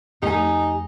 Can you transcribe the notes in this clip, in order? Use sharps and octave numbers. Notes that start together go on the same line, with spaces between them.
F2 A3 D#4 G4 G#5